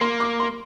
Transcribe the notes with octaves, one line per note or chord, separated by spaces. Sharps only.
A#3 C6
D6
C6